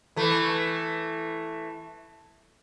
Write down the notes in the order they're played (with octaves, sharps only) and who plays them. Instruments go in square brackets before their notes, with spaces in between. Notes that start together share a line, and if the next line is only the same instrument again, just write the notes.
[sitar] E3 A3